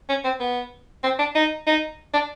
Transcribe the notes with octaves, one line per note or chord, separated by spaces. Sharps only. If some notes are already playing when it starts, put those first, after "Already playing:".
C#4
C4
B3
C4
D4
D#4
D#4
D4